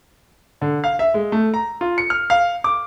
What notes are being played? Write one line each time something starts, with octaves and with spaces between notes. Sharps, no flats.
D3
F5
E5
G#3
A3
A#5
F4
C#7
F6
F5
D6